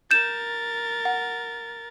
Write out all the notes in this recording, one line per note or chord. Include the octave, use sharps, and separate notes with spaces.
A#4 G6 A6 E7
F#5